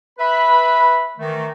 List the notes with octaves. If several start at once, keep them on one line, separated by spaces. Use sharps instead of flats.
B4 E5 B5
D#3 E3 A3